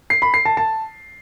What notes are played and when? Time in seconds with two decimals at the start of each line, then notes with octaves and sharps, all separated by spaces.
0.10 C7
0.22 B5
0.34 C7
0.45 A5
0.57 A5